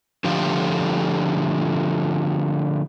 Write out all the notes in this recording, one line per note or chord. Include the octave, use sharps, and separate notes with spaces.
D3 F3 A3 F4 G4